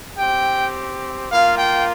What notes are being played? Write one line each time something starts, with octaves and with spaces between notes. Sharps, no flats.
C4 G4 G5
A#3 F4 F5
G5